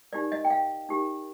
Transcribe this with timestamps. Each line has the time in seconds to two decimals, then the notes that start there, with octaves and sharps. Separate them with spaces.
0.13 D#4 G4 A#4 D5
0.32 D#5
0.44 G5
0.50 F5
0.89 D#4 G4 A#4